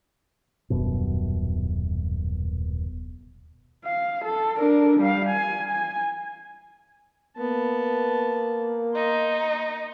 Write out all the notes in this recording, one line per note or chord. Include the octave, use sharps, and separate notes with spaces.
D#1 F#2 B2
F5
A4
D4 A#4
G3 F5
G#5
G#5
A#3 B3 A5
D#4 C6